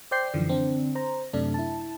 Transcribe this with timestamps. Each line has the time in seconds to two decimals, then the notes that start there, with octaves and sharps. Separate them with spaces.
0.11 C5 D5 G5 G6 C7
0.34 F#2 D3 E3 F3
0.48 D3 C4 D4
0.95 C5 A#5
1.33 F#2 C3 A3 D4
1.54 E4 A5